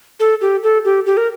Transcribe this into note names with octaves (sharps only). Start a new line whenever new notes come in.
A4
G4
A4
G4
G4
A#4